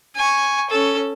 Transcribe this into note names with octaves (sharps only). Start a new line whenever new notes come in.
G#5 C#6
C#4 A4